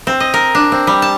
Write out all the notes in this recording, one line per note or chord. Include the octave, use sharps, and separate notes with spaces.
C4
D#5
A#4
D4
C4
G3
A5